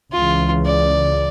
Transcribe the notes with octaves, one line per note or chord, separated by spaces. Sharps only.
C#2 C#3 E3 F4
D5